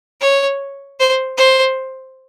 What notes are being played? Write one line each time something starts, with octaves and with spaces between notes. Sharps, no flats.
C#5
C5
C5